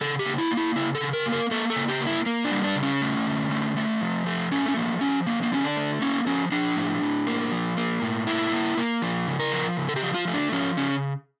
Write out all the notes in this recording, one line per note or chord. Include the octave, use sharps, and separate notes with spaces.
C#3 A4
G4
A#3
E4
A#3
E4
C#3 E4
A4
C#3
A#4
A#3
A#4
A#3 A4
A4
C#3
G4
A#3
E4
A#3
D4
G3
D4
C#3
C#4
A3
D3
A3
A3
F3
A3
A3 C#4
C#4
F3 A#3
F3 C#4
D3 A#3
A#3
D3 C#4
D4
A3
A#3 C#4
F3 C#4
F3 D4
A2
A2
A#3
F3
A#3
A2
A#3 E4
A#3
A#3
F3
C#3
A#4
F3
C#3
A4
G4
F3
F4
A3
D4
F3 C#4
C#3 C#4